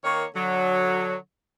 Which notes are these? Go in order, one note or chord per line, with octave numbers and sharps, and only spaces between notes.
D#3 A#3 C#5
D3 F#3